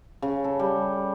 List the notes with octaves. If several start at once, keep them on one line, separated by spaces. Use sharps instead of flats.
C#3
A4
G3